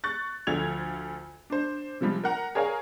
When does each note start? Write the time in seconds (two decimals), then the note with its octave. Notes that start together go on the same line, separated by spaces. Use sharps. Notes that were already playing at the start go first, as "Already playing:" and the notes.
0.04 C#6 F#6 A6
0.47 D2 F3 A4 G#6 F7
1.50 D4 C5
2.01 C3 F3 G3 G#3
2.24 A#4 F#5 A#5
2.55 G#4 A#4 C#5 F5 G#5